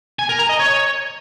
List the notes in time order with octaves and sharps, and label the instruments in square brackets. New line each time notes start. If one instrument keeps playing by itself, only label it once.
[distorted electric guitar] G#5
A#4
A#5
D#5
C#5